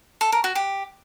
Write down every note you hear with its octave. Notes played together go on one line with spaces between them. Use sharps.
A4
A#4
F#4
G4